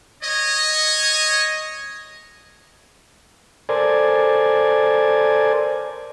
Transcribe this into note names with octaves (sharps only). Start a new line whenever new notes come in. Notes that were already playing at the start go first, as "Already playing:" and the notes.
C#5 D#5
A4 A#4 C5 D5 G#5